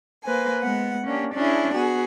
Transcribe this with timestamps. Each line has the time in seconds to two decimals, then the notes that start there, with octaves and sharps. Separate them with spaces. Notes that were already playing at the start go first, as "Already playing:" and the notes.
0.25 A#3 B4 C5 G#5
0.62 G#3 B3 F#5
1.05 A#3 C#4 D4 G4
1.35 C#4 D4 E4 G#4
1.74 B3 F#4 G#4